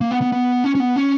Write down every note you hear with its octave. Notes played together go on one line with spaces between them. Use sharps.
A#3
B3
B3
B3
C#4
C#4
B3
C#4